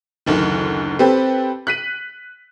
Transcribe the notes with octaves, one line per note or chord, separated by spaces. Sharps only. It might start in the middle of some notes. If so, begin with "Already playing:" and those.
F#1 D2 D#3
C4 G4 A4 B4
F#6 B6 D#7